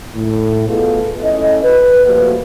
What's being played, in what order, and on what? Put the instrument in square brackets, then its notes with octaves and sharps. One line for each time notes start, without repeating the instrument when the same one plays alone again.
[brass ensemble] A2
B2 B3 F4 G#4 A4
A3 C#4 E4 A4 D#5
B4
F3 G3 A3 A#3 F#4